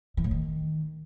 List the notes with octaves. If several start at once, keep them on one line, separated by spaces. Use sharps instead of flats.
E3
A2
D#3